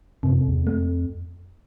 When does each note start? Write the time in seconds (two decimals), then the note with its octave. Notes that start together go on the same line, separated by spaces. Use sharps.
0.23 F#2 C3
0.36 F2
0.48 E2
0.62 F2 A3